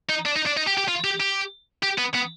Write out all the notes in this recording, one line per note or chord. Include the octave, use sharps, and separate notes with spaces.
D#4
D4
D#4
D4
D#4
G4
G4
F4
G4
G4
G4
B3
B3